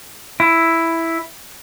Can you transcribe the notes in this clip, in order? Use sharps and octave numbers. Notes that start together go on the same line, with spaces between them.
E4